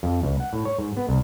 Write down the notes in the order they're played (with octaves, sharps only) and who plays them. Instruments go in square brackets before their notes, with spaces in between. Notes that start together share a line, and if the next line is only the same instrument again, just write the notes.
[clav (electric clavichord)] F2
C#2
F#5
A2
C#5
G#2
B3
C2